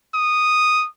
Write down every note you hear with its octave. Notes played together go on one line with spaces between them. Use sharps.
D#6